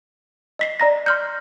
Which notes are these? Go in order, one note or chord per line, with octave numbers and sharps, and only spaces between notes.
D#5 B6 C7
D5 A#5 A#6
C6 F6 G6